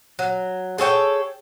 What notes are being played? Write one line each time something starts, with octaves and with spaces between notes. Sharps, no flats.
F#3
G#4 A4 C#5 G5